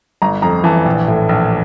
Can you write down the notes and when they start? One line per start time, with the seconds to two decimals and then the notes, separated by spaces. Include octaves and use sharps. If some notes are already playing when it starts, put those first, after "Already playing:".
0.22 G1 A#5
0.42 F2 A#5
0.64 E3 A5
0.85 A#1
1.08 A2
1.29 A#1